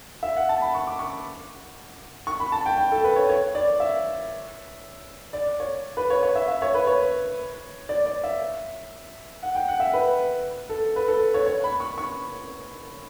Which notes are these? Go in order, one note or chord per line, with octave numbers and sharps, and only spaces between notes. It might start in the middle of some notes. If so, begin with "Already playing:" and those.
E5
F#5
A5
B5
C#6
D6
C#6
C#6
B5
A5
G5
G5
A4
B4
C#5
C#5
D5
E5
D5
C#5
B4
C#5
C#5
E5
E5
C#5
B4
C#5
D5
D5
E5
F#5
G5
F#5
E5
B4
A4
B4
A4
C#5
C#5
B5
C#6
C#6